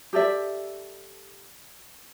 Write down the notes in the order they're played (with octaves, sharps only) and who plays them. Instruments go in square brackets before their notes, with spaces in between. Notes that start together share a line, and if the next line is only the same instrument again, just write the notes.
[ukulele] G4 A4 D5 E5